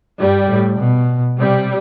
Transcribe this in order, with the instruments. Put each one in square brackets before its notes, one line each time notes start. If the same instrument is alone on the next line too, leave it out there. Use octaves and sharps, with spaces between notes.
[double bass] G2 [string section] G3
[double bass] A2
B2
[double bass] C3 [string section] G3